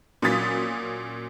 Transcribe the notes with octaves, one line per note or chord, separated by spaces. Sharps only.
A#2 F#3 C#4 D#6 A6 B6